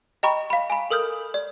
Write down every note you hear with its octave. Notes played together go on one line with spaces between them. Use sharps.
D#5 G5 A#5 B5 C#6
F5 B5
G#5 B5
A4 A#4 D#6 F6 G6
D5